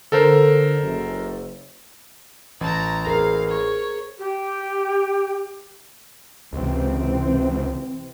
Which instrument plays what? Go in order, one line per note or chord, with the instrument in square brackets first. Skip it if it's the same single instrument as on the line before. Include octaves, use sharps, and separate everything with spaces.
[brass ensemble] D3 [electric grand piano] A4 A#4 C5
[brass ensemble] F#1
[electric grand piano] A1 [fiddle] A5 A#5
[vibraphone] G#4 C5 [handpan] A#4 [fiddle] F5
[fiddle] C#5
[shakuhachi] G4
[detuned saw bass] C#2 [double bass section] C3 E3 C4